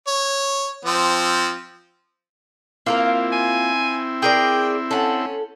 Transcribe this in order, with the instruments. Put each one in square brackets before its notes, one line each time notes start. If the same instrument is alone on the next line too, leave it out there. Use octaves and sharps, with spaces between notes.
[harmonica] C#5
F3 C4
[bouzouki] A#3 F4 A#4 [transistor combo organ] C4 E4
[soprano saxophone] G#5
[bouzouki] G#4 A#4 D5 [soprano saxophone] G5
[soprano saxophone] C#4 [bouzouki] A4 F#5